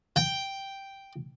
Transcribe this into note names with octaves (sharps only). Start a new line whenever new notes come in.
G5